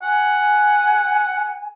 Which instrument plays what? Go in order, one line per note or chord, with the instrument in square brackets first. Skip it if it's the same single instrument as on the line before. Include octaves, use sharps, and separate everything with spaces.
[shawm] F#5 [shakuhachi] G#5